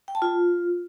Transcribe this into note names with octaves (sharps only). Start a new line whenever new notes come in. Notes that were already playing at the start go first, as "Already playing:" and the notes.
G5
A5
F4